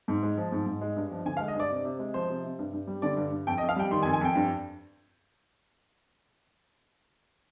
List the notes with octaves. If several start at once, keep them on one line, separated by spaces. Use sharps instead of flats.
G#2
G#3
F3
G#2
G#2
G#3
G2
F3
D3 G#5
F5
G#3
D#5
G2 D5
C3
C3
G#3
F3 C5
C3
C3
G2
G2
G3
D3 D5
G2
G2
F2 G5
D#5
F2
F5
G3 G5
D#3 C6
G#5
F2
G#5
F2 G5
G2